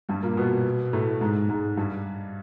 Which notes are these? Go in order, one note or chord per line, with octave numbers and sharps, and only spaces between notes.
G2 G3
A#2 A#3
B2 B3
A2 A3
G#2 G#3
G#2 G#3
G2 G3